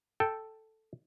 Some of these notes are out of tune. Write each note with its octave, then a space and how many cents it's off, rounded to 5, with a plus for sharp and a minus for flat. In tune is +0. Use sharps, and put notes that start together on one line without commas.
A4 +0 G5 +0